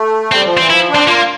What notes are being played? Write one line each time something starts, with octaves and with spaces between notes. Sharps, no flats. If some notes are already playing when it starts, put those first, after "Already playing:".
Already playing: A3
G3 C4
F3
E3 C4
F3 E4
D4
C4
A#3 F4